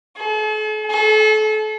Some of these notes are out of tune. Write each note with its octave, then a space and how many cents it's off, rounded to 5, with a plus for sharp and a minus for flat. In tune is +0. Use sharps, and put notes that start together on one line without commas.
A4 -45
A4 -35